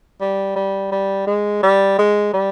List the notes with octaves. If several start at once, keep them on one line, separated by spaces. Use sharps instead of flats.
G3
G3
G3
G#3
G3
G#3
G3